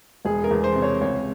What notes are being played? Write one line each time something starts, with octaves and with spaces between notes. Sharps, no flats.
E1 G#4
A#4
E2
C5
C3
C#5
C#2 C#5